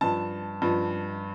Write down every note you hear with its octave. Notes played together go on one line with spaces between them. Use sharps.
G2 F3 A5
G2 F3